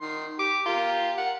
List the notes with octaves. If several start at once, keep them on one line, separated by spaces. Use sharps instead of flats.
D#3 C6
G4 D6
F4 G4 A#4
A#4 F#5